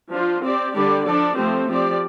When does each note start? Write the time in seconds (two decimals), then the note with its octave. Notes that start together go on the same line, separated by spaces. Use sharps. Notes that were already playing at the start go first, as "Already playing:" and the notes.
0.12 F3 D4 F4
0.42 C4 G4 D5
0.74 D3 G3 D4 G4 D5
1.05 F3 D4 A4 D5
1.37 F3 A3 C4 G4 C5
1.68 F3 C4 G4 D5